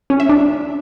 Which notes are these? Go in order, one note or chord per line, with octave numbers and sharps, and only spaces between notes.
C#4
E5
D4